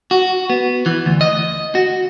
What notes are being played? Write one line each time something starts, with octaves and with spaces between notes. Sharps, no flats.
F#4
B3
E3
D2
D#5
F#4